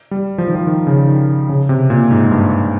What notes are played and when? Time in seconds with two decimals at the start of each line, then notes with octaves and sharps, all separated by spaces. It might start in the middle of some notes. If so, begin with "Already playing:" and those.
0.11 G3
0.38 F3
0.48 D#3
0.56 F3
0.67 D#3
0.87 C#3
1.07 D#3
1.49 C#3
1.69 C3
1.90 A#2
2.11 G#2
2.31 G2